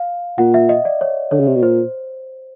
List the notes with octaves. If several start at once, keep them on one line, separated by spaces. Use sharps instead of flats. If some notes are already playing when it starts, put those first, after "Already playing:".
Already playing: F5
A#2 F#5
E5
D#5
D5
C#5
D3 C#5
C#3
C3
B2
A#2 C5